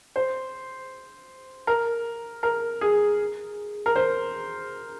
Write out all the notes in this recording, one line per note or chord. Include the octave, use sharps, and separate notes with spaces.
C5
A#4
A#4
G#4
A#4
C5